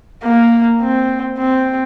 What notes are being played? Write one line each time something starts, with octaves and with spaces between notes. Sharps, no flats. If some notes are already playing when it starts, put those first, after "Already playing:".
A#3
C4
C4